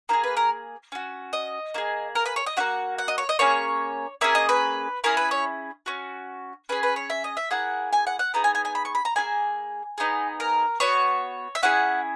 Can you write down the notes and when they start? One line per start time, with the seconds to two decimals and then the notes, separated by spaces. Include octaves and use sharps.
0.09 A#3 E4 A#5
0.13 G#4
0.24 B4
0.37 A#4
0.92 C#4 F#4
1.33 D#5
1.74 A#3 E4 G#4
2.15 A#4
2.26 B4
2.36 C#5
2.46 D#5
2.57 A#3 C#4 F#4 F#5
2.98 F#5
3.08 D#5
3.18 C#5
3.29 D#5
3.39 A#3 C#4 G#4 C#5
4.21 A#3 C#4 G#4 E5
4.35 D#5
4.49 B4
5.04 C#4 E4 G#4 A#4
5.17 B4
5.31 C#5
5.86 C#4 F#4
6.69 C#4 G#4 B4
6.83 B4
6.96 C#5
7.10 E5
7.24 D#5
7.37 E5
7.51 A#3 E4 G#4 F#5
7.93 G#5
8.07 F#5
8.19 F#5
8.34 B3 D#4 G#4 A#5
8.44 G#5
8.55 G#5
8.65 G#5
8.75 B5
8.85 C#6
8.95 B5
9.05 A#5
9.16 A#3 E4 G#4 G#5
9.98 B3 D#4 G#4
10.40 A#4
10.80 B3 F#4 C#5
11.55 E5
11.63 C#4 E4 G#4 F#5